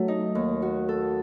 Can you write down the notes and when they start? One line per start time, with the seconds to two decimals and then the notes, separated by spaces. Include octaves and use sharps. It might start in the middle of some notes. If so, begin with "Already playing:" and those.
Already playing: F#3 A3
0.08 D#4
0.35 D#2
0.62 F#4
0.89 A4